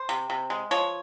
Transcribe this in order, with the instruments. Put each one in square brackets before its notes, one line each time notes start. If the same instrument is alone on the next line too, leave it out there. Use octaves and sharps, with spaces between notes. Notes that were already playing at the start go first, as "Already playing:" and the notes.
Already playing: [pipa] C5
C3
C3
G#3
F3 C#5